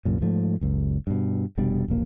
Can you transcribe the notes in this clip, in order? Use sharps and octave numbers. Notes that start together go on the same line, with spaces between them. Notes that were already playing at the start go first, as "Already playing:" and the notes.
C2 F#2 A#2
G#2 F3 A3
F#1 C#2
G2 B2
F1 B2 G3 D4
E1 A#1 A#3